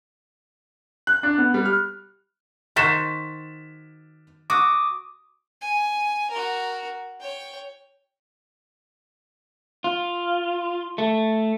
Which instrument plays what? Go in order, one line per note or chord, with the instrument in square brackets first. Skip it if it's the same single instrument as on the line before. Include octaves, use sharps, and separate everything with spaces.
[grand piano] F#6
D4
B3
G3
F6
[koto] D#3 F#4 C5 [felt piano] A6 B6 E7
[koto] F#4 [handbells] D6 D#6
[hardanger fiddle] G#5
F#4 A#4
C#5 G5
[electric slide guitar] F4
A3